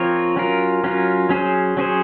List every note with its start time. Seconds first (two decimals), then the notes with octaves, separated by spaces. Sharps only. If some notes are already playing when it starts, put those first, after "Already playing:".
Already playing: F3 C4 F4 A#4 C#5
0.36 F#3 C#4 F4 A#4
0.84 F#3 C#4 F4 A#4
1.29 F#3 C#4 G#4 C5
1.77 F#3 C#4 G#4 C5